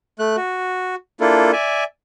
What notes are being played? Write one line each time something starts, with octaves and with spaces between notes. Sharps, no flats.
A3 F#6
F#4
A#3 D4 E4 F4 A4
D5 E5 G#5